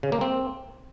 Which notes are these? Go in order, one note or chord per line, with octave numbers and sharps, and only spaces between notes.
C#3
A#3
C4